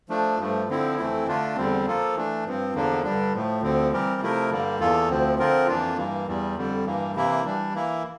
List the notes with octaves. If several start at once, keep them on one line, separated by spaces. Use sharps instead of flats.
F3 A3 D4
G2 F3 A3
D3 F3 C4 E4
F2 E3 A3 C4 E4
D3 A3 D4 F4
E2 D3 G3 C4
F3 A#3 F4 A4
E3 A3 D4
G2 F3 C4
E2 D3 F3 A#3 D4
G2 D3 G3 D4
A2 F3 A3
D2 D3 F3 C4
E3 G3 C4 G4 A#4
C3 F3 A3 E4 A#4
G2 D3 G3 A#3
E2 E3 A#3 F4 A4
D2 D3 F3 C4
D3 F3 C4 F4 A#4
F2 E3 A#3 D4 F4
G2 E3 A#3
E2 E3 G3
F2 D3 G3
G2 E3 A#3
C3 E3 A#3 E4
E3 G3 D4
E3 A#3 E4